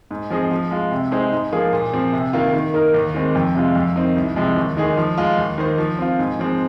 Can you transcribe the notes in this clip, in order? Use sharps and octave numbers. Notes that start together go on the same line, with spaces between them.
G#2
F3 C4 G#4 D#5
F3
G#3 F4
C3
G#3 D#4 G#4 C5
G#2
F3 A#3 F4 G#4
A#2
F3 C4
C3
D#3 A#3 F4
D#3
A#3 D#4 A#4
D#2
D#3 G#3 C4
F2
C3 G#3 F4
F2
D#3 C4 D#4
C2
C3 F3 G#3
D#2
D#3 G#3 D#4 G#4
F3
G#3 F4
D#2
D#3 A#3 D#4 C5
F3
C4 F4
G#2
F3 G#3 C4